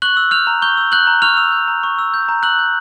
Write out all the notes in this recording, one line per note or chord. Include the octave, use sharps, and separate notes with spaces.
C#6 F#6 F#7
E6
F6 G6 F7
A#5
C#6 G6 G7
E6
F#6 G6 F#7
A#5
C#6 F6 F7
E6
G6
A#5
C#6
E6
G6
A#5
E6 F#6 F#7
G6